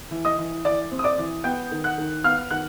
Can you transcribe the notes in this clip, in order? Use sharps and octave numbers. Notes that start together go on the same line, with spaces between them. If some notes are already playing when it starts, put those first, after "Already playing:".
E3
D#5 D#6
E3
E3 D5 D6
C4
D#6
D5 D6
E3
B3 G5 G6
D#3
F#5 F#6
D#3
B3 F5 F6
D#3 F#5 F#6